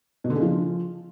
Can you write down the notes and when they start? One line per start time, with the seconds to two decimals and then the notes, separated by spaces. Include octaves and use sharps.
0.24 B2
0.30 D3
0.36 C#3
0.41 F3